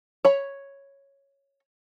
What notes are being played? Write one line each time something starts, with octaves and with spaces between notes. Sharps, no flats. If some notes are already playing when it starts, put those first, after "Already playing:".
C#5 B5